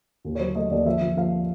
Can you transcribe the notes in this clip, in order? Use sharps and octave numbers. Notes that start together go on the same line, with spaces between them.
D#2
C#5
F#3 C5
A3 D#5
D#2 D5
F3 E5
F3
F3 F5